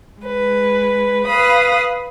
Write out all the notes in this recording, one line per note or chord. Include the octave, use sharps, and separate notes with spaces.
G#3 B4
B4 F5 B5 D#6